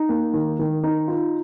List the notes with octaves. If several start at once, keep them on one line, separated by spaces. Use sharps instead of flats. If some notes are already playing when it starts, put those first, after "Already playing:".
Already playing: D#4
A#3
D#3
D#3
D#4
F4